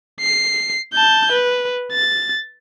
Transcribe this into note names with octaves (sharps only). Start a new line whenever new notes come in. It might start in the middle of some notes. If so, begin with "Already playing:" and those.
C7
A5 G6
B4
A6